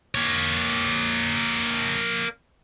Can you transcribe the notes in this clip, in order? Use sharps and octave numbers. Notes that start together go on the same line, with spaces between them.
A#3 C#5